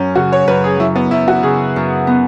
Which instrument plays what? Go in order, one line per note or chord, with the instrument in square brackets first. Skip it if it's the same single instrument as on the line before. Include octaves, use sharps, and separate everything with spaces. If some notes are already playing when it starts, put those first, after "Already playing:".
Already playing: [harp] F#2 F#3 [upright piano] C#4
[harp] C#3 [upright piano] F#4
[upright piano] C#5
[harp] F#2 [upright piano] B4
[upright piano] G#4
[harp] F#3 [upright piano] E4
[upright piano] B3
[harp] F#2 [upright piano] E4
[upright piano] F#4
[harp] C#3 [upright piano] G#4
[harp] F#2
B3